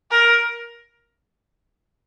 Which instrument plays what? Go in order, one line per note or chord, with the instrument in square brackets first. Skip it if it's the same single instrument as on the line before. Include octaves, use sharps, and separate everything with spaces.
[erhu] A#4